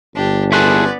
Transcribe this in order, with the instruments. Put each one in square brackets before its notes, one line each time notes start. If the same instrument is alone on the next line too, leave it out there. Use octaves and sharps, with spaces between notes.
[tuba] G1 [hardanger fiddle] D4 G4
[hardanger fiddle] B3 D5 [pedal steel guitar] C#4 C6 F#6 [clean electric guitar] E4 G#4 A4